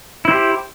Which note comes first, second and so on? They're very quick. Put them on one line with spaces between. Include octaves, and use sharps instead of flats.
E4 C5 G4